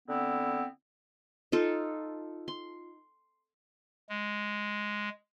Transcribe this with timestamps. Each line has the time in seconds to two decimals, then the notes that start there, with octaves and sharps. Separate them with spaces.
0.08 D3 B3 C4 E4
1.52 D#4 F4 A4
2.48 C6
4.09 G#3